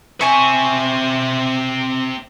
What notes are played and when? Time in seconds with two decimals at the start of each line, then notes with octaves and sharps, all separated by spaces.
0.21 C4 E5 G#5 C#6